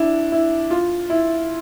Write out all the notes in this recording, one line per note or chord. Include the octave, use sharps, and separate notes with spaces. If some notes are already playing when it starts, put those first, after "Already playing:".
Already playing: D4 E4
E4
F4
E4